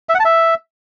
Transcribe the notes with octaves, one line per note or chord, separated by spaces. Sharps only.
E5
F#5
A5
E5